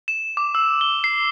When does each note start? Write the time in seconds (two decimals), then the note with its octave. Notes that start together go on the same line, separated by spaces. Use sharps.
0.08 E7
0.37 D6
0.55 E6
0.81 G7
1.04 C7